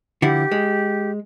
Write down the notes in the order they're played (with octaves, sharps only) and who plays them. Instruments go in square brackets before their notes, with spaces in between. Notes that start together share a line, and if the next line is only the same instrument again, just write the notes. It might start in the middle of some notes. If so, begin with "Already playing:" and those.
[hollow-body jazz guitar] D3 F3 E4 [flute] G4
[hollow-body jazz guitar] G#3